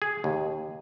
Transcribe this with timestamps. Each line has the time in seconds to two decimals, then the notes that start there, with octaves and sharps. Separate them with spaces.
0.02 G#4
0.24 D#2